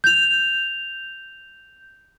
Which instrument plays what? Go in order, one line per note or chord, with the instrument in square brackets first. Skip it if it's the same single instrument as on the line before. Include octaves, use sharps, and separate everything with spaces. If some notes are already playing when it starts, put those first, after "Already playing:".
[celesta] G6 F7